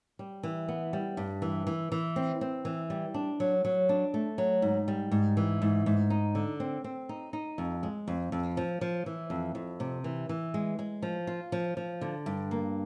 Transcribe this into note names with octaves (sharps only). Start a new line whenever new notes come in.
G3
E3
B3
G3
G2
E3
E3
E3
C4
C4
E3
G3
D4
F#3
F#3
D4
A3
F#3
G#2
G3
G#2
E3
G#2
G#2
D#4
D3
C4
C4
D#4
D#4
F2
G#3
F2
F2
F3
F3
E3
F2
F2
C3
E3
E3
G#3
G#3
F3
F4
F3
F3
D3
G2
A#3